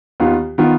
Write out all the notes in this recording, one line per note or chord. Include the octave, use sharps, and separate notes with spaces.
D#2 D#3 B3 F4
D#3 B3 F4